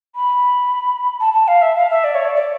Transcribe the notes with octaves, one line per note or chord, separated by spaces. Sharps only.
B5
A5
A5
F5
E5
F5
E5
D5
C#5
D5
D5